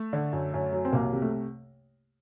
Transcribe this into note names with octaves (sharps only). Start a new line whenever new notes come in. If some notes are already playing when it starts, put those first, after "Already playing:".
Already playing: A3
D3
F#2
F#2
F#3
C4
C2 A#3
C3
A3